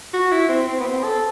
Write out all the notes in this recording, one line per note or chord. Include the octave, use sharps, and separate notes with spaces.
F#4
E4
C4
C4
B3
C4
A4